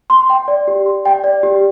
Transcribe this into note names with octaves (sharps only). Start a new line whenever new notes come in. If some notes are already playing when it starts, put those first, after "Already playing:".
C6
G5
D5
G4
C6
G5
D5
G4